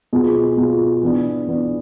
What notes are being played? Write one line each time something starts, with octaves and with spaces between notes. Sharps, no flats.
B2 B3 F4 G#4
B2 B3 F4 G#4
E3 B3 D4
E3 B3 D4